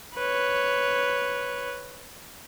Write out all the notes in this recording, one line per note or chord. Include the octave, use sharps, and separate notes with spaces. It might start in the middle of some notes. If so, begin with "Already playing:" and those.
B4 C#5